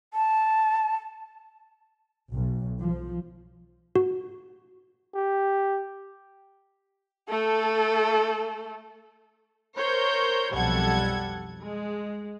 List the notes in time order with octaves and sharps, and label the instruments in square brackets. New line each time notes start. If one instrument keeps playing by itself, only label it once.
[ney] A5
[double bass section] B1
F3
[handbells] F#4
[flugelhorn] G4
[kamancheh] A3 A4
[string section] A#4 C5 C#5 G6
B1 F2 G3 A4 F#5 G#6
G#3